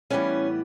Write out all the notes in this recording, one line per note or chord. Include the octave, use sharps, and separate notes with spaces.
A2 E3 G3 B3 C#4